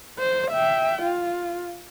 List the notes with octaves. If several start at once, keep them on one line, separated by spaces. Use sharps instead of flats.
C5
E5 G5
F4